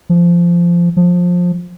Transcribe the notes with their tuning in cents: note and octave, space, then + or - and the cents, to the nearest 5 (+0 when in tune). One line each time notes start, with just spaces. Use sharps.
F3 -15
F3 +20